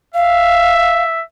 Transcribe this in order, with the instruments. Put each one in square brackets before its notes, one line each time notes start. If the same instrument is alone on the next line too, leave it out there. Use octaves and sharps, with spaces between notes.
[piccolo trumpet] E5 [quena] F5